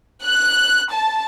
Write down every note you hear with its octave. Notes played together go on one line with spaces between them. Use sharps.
F#6
A5